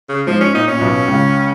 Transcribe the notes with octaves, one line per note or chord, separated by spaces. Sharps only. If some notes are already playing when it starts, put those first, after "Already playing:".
C#3
G#2 F3
C#4
A#2 D#4
C#4
A#2
B1 B2
C#2 C#3